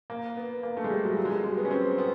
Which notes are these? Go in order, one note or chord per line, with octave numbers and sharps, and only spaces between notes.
A#3
B3
A#3
A3
G#3
G3
F#3
F#3
G#3
G3
G#3
B3
C#4
C4
B3